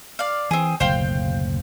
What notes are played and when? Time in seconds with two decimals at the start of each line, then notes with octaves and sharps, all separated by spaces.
0.19 D5 F5
0.51 E3 C4 G#4
0.80 F#1 D2 B2 C5 F5 G5